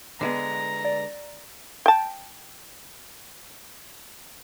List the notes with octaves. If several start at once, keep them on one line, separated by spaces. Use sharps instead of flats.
D3 G#3 B3 A#5
D5
G5 A5